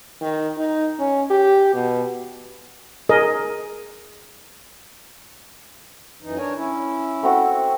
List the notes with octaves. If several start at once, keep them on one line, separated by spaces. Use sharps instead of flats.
D#3
D#4
C#4
G4
B2
G#4 A#4 D#5
F#2 E3 D#4
D4 A#4 C#5 G#5
C#4 E4
A3 C4 F#4